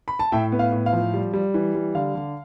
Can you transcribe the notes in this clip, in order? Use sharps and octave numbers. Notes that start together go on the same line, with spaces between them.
B5
A5
A2 E5 G5
B3
F5
A2
F5
F3
G3
G3
E3
G3
D3 F5
D3